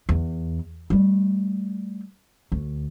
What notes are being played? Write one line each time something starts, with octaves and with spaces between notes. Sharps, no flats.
E2
G3 A3
D2